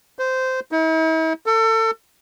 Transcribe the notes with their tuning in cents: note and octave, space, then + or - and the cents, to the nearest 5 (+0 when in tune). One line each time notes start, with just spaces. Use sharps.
C5 -15
E4 -45
A4 +30